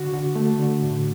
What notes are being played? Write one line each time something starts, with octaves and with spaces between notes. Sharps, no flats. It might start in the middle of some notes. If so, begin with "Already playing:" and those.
Already playing: D3 F#4
D3
A3
D3
A2